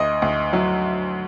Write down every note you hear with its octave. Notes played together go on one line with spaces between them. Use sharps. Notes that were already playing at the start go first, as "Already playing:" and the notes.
Already playing: D2 D#5
D2
F#3